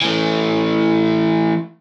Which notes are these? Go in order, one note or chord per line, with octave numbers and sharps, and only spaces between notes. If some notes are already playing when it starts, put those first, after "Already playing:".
E3 A3